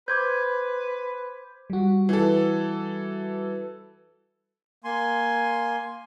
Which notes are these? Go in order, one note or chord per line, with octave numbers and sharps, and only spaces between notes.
B4 C5 C6 D6 G6 G#6
G3 F#4
E3 A4
A#3 G#5 C6